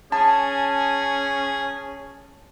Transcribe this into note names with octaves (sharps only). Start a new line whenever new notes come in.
C#4 G#4 A5